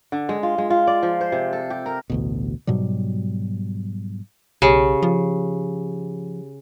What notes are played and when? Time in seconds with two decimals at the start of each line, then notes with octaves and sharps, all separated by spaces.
0.12 D3
0.29 G#3
0.43 F4
0.58 G#3
0.70 F4
0.87 D5
1.03 F3
1.21 C5
1.32 C3
1.53 A4
1.70 G4
1.86 A#4
2.10 A1 D2 B2
2.67 G#2 B2 F#3 G3
4.62 B1 C#3 G4
5.03 F3